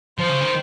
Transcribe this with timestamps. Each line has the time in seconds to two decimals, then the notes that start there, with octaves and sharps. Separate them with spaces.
0.19 F3 C5
0.29 C#3
0.41 D#3